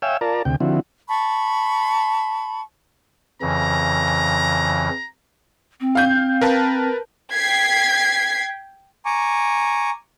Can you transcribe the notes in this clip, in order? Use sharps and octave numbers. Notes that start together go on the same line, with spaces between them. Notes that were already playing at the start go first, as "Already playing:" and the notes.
C#5 E5 F5 G5 G#5 E6
F4 A#4 D5 A5 A#5
D2 C3 G5
D3 F3 C4 E4 F#4
A5 B5 C#6
F2 C#3 E3 A#5
C4
F5 G6
A#4 B4 A5
G5 G#6 B6 C7
G#5 A#5 C#6 D6